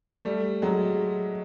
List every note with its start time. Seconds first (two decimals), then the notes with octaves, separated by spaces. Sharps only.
0.25 G3 A3
0.62 F#3 G#3